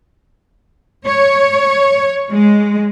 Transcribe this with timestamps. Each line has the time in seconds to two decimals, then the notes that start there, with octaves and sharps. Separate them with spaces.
1.06 C#5
2.30 G#3